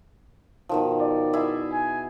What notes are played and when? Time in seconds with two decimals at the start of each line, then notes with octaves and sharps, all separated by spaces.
0.69 B2 D#3 F3
1.01 D5
1.33 E4 G#4
1.72 G#5